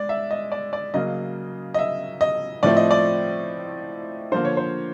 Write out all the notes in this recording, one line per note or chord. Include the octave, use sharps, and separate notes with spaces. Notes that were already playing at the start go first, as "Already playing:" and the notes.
Already playing: G#3 D5
E5
D#5
D5
D5
C#3 F#3 A#3 D#5
D#5
E5
D#5
A2 F3 A3 C4 D5
D#5
D5
D3 F3 A#3 C5
C#5
C5